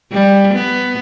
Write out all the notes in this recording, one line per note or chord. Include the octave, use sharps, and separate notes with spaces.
G3
B3